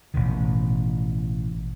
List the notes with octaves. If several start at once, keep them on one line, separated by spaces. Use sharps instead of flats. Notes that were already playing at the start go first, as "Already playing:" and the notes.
A1 B2 D#3